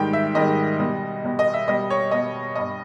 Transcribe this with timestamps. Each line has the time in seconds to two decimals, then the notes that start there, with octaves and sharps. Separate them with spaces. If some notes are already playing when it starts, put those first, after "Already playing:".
Already playing: G#2 D#3 G3 G5
0.13 E5
0.35 G#2 D#3 G3 D#5
0.79 B2 G3
1.24 B2 G3
1.39 D#5
1.54 E5
1.68 B2 G3 D#5
1.90 C#5
2.11 B2 G3 D#5
2.55 G2 G3 D#5